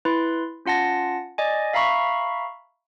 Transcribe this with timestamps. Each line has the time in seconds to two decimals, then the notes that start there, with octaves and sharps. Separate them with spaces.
0.05 E4 B4 C6
0.65 C#4 F4 F#5 A5 A#6
1.38 D5 D#5 G#5
1.73 E5 F5 A#5 B5 C#6